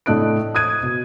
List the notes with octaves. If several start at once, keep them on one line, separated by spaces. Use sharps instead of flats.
A2 A3 D4 D#5 F#6 D7
D#6 F#6 G#6 D#7
B2